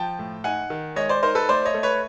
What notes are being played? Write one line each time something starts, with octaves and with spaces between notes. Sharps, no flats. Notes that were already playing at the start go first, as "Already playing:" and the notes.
Already playing: F3 G5 A5
A2
D#4 F#5 G#5
D#3
G#3 C#5 D#5
C5 D5
D#4 A#4 C5
A4 B4
A3 C5 D5
C#5 D#5
A3
B4 C#5